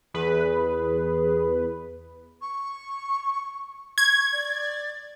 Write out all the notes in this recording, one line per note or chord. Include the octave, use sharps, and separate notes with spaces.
E2 G#4 B4
C#6
C#6 G#6
D5